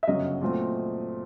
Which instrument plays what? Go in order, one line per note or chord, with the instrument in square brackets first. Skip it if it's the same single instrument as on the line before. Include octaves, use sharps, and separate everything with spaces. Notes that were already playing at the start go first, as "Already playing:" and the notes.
[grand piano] E5
[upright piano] G1 F#2 C#3 F#3 [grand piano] D#5
[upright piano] A#2 F#3 A3 C4